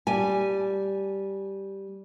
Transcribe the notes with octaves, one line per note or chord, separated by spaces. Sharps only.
G3 G#5